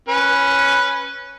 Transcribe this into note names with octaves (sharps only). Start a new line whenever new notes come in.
C#4 B4